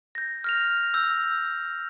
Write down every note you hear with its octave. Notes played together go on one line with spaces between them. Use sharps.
G6 A#6
F6 A#6 F7
E6 G6